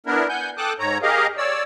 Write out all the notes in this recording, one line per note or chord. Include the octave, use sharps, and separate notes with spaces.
B3 D4 E4 A#4
F#5 G#5 G6
A4 G5 A5 D6 D#6 F#6
G#2 C#5 A#5
G4 G#4 A#4 D#5 F5
C#5 D5 E6